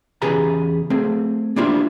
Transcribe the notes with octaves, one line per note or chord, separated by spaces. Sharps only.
E2 C#3 G4 G#4 B4 A#5
A3 C4 G#4
A#3 D4 E4 F4 G4 C5